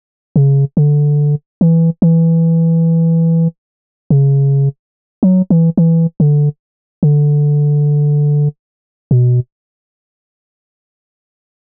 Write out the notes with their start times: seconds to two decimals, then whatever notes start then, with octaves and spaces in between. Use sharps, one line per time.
0.36 C#3
0.77 D3
1.61 E3
2.02 E3
4.10 C#3
5.23 F#3
5.50 E3
5.77 E3
6.20 D3
7.03 D3
9.11 B2